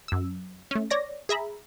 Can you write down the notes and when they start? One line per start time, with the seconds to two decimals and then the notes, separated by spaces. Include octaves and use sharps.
0.08 F#2 E6
0.71 A3 C#4
0.91 C#5 D5 A#6
1.29 G#4 E5 A#5 B5